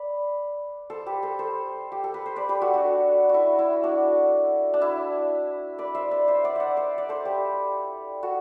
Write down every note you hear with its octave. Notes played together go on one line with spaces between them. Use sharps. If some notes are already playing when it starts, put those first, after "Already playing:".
Already playing: B4 D5
A4 C5
G4 B4
A4 C5
A4 C5
G4
A4
B4
C5
B4 D5
G4 B4
F#4 A4
D4 F#4
E4 F#4
E4
D4 F#4
D4
E4
B4 D5
C5 E5
B4 D5
C5 E5
D5 F#5
D5 E5 F#5
C5 E5
D5
A4 C5
G4 B4
F#4 A4